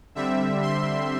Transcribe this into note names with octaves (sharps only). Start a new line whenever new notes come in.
D3 G3 C4 E5
C6